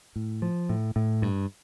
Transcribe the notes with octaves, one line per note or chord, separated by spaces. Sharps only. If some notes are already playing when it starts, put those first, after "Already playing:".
A2
F3
A2
A2
G2